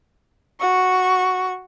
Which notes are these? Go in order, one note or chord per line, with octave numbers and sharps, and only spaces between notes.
F#4 C#6